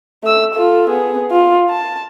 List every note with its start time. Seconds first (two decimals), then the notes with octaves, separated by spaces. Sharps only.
0.23 A3 E6
0.54 F4 A4
0.90 B3 G#4
1.31 F4
1.70 A5